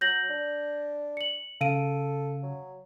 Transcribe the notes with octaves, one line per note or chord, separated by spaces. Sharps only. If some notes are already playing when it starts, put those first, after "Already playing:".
F#3 G6 A#6 F#7
D4
C#7 F#7
C#3 A4 F5 D7 D#7
F#3